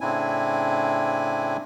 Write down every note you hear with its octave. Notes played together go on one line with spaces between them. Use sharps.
A2 C#3 C4 D4 E4 G#5